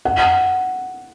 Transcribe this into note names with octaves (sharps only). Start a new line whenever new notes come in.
F#5